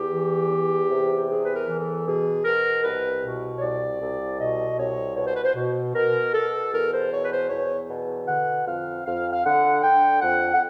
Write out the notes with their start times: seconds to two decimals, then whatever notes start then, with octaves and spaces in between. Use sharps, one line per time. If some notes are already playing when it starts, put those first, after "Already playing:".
Already playing: E2 G4
0.11 E3
0.50 E2
0.90 C3
1.28 E2 G#4
1.44 B4
1.53 A#4
1.67 E3
1.80 A4
2.06 B2 G#4
2.45 B2 A#4
2.83 C2 B4
3.22 B2
3.57 C#5
3.61 C2 D5
4.00 C2
4.39 B2 D#5
4.77 C2 C#5
5.16 B2 C#5
5.26 C5
5.35 B4
5.44 C5
5.55 B2
5.94 B2 A#4
6.34 B2 A4
6.72 E2 A#4
6.92 C5
7.10 B2 C#5
7.22 B4
7.31 C5
7.49 E2 C#5
7.89 B2
8.27 D3 F#5
8.66 F2 F5
9.05 F2 F5
9.32 F5
9.44 D3 F#5
9.82 D3 G5
10.22 F2 F#5
10.53 F#5